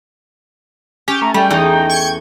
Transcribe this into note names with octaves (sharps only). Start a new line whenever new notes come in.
C#4 G4
A3 A#5
G3 A3 G5
E2 D#4
C#6 G6 G#6